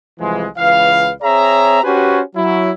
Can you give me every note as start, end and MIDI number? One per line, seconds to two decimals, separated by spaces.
0.20 0.46 36
0.20 0.46 52
0.20 0.46 53
0.20 0.46 56
0.57 1.11 37
0.57 1.11 52
0.57 1.11 71
0.57 1.11 77
1.22 1.79 60
1.22 1.79 68
1.22 1.79 73
1.22 1.79 76
1.22 1.79 82
1.83 2.20 61
1.83 2.20 66
1.83 2.20 67
1.83 2.20 71
1.83 2.20 72
1.83 2.20 80
2.36 2.71 54
2.36 2.71 64